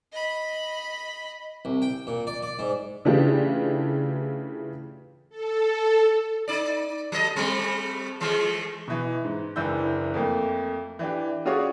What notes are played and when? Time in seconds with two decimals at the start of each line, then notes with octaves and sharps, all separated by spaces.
0.13 D#5 B5
1.65 C2
1.82 G5
2.07 A#2
2.27 D5
2.43 D5
2.59 G#2
3.05 C#3 E3 A3 D4 F4 G4
5.30 A4
6.48 D#4 D5
7.12 F#3 A4 D#5
7.36 G3 A3 C4
8.20 E3 G#3 A3
8.88 B2 E3
9.25 G#2
9.56 F#1 E3 D4 E6 G6
10.14 F2 A3 A#3
10.99 E3 D4 G4
11.45 C#4 F4 F#4 G#4 C#5 D5